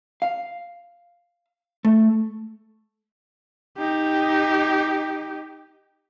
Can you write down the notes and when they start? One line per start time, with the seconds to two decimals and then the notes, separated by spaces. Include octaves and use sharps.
0.22 F5
1.85 A3
3.77 D#4 G4